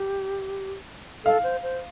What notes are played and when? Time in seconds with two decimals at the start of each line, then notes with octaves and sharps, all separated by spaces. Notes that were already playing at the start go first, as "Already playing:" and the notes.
Already playing: G4
1.25 A4 F5
1.43 C5
1.63 C5